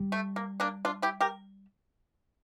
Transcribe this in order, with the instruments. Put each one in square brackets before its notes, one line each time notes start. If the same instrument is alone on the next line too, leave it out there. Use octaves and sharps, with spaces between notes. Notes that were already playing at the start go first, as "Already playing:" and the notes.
Already playing: [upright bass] G3
[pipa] A3
A#3
A#3 D4
D4 F4
E4 G4
G4 A#4